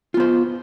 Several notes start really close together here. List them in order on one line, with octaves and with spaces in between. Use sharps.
F4 B3 C5